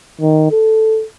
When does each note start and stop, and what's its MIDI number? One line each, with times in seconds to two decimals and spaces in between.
0.21 0.50 51
0.52 1.04 69